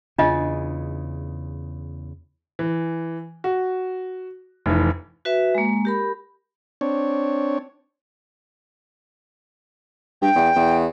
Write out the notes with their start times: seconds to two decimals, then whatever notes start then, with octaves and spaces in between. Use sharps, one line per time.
0.19 E2 C#3 D4 F4 D#5
2.59 E3
3.44 F#4
4.66 F1 E3
5.25 F#4 B4 E5
5.55 G#3 A#3
5.85 G4 A#4 B5
6.81 C4 D4 C#5
10.22 G2 G5
10.35 E2
10.55 E2